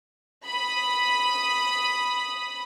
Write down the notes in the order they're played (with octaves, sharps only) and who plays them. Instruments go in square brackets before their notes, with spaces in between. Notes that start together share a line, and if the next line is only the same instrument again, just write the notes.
[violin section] B5 D#6